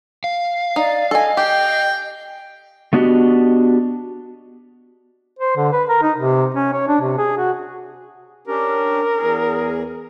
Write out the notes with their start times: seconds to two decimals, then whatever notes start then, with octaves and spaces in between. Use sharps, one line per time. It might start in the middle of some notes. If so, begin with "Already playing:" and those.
0.24 F5
0.76 D#4 D5
1.11 A4 D#5 G#5
1.37 G4 G5
2.93 A3 B3 D4 F#4 G4 D#5
5.39 C5
5.57 D3
5.73 B4
5.89 A#4
6.02 D#4
6.17 C3
6.55 C#4
6.73 C#5
6.88 D4
7.01 C3
7.18 G#4
7.37 F#4
8.47 C#4 D4 G4 A#4
9.16 E2 G#4